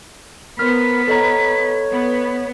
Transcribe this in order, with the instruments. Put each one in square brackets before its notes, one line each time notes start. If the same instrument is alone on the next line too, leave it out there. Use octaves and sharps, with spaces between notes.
[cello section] B3 [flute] A#4 [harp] C5 F6 [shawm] B5
[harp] A4 D#5 A#5 [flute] C#5
[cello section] B3